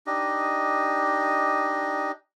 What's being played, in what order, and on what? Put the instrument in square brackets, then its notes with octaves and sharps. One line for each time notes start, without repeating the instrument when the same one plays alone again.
[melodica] D4 D#4 G4 D#5